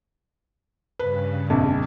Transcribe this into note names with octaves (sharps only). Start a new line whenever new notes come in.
G2 C#3 B4
A#1 F2